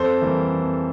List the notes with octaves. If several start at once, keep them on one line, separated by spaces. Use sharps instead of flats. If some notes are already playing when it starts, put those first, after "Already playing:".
Already playing: F2 A4 C5
E3 G3 A#3
F2